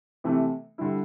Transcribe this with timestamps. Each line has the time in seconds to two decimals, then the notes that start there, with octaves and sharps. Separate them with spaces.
0.24 C3 E3 A3
0.78 D3 G3 E4